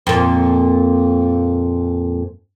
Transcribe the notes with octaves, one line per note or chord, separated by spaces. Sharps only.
F2 A#2